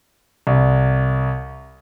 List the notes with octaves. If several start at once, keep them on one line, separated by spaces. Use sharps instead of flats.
C2